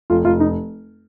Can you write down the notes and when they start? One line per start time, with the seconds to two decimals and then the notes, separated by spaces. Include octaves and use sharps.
0.10 F1 F4
0.25 F1 F4
0.40 D#4